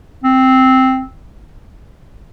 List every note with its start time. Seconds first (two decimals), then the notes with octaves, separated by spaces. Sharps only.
0.24 C4